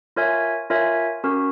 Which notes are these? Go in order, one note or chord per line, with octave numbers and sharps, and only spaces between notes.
F4 A#4 C#5 E5 G#5
F4 A#4 C#5 E5 G#5
C#4 F#4 A#4